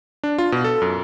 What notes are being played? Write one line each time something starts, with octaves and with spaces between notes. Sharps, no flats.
D4
F4
B2
A4
F#2